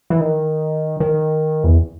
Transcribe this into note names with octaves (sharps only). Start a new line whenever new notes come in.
E3
D#3
D#3
E2